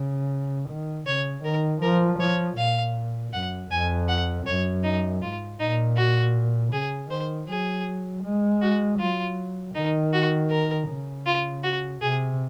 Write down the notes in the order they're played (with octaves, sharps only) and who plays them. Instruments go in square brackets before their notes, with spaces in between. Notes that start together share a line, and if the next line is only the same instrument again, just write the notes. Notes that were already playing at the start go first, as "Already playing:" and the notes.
Already playing: [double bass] C#3
D#3
[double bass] C#3 [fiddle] C#5
[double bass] D#3 [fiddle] A#4
[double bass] F3 [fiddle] A#4
[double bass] F3 [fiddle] C#5
[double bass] A#2 [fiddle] F5
[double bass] F#2 [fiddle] F#5
[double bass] F2 [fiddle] G#5
[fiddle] F#5
[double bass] F#2 [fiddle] C#5
[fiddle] D#4
[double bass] G#2 [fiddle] F4
[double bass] A#2 [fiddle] D#4
[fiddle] F#4
[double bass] C#3 [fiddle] G#4
[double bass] D#3 [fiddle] C5
[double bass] F#3 [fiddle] G#4
[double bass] G#3
[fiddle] F#4
[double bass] F#3 [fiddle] F4
[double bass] D#3 [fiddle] D#4
[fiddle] F#4
A#4
[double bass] C#3
[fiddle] F4
F#4
[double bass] C3 [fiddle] G#4